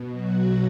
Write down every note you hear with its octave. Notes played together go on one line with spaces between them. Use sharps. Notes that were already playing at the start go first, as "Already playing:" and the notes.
Already playing: B2
F#3 F#4